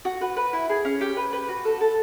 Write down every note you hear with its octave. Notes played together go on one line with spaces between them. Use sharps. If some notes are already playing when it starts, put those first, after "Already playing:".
F#4
B4
B4
E4
G#4
C#4
G4
B4
B4
F#4
A4
A4